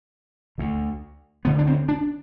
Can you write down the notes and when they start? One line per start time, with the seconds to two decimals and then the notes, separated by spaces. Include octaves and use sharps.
0.58 D2 D3
1.45 D2 D3 B3
1.58 D4
1.67 C4
1.89 D4